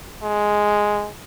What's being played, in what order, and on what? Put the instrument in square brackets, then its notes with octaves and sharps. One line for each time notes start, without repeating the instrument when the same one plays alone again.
[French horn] G#3